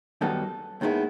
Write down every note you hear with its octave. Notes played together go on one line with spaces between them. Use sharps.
F#2 D#3 G3 B3 D#4 A4
D#2 D#3 G#3 B3 E4